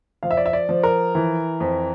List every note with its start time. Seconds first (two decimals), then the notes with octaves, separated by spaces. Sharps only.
0.23 F3 F5
0.31 E5
0.37 D5
0.45 E5
0.53 D5
0.69 F3
0.83 A#4
1.15 E3
1.60 F2